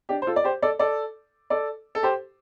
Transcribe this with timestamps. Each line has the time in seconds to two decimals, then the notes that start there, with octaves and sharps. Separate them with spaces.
0.09 D4 G4
0.22 C5
0.27 F4 A4
0.36 D5
0.44 G4 C5
0.62 A4 D5
0.79 A4 D5
1.50 A4 D5
1.95 A4
2.03 G4 C5